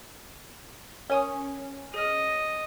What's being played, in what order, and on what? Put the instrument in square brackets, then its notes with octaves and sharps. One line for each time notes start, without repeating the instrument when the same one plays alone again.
[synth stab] C#4 [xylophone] A#4 G#5 D#6
[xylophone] G#4 F6 [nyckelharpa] D#5